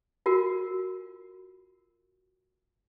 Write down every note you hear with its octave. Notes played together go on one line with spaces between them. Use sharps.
F4 F#4 A#4